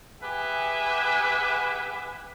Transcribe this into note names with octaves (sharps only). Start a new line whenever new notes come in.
G4 G#4 B4 E5 F#5 G#5